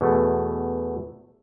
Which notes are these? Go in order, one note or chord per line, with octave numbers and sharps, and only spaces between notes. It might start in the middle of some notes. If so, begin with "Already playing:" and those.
E2 B2 A3